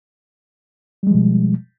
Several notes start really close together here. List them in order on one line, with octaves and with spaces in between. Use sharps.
G3 G#3 F3 B2